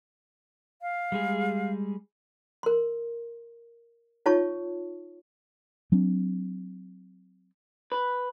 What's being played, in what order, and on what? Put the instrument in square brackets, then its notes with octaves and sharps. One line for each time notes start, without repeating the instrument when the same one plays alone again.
[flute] F5
[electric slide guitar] G3 G#3 G#4
[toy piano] A#4 C6
D#4 F4 C#5 A5 C#6
[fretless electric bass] F#3 C4 D4
[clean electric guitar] B4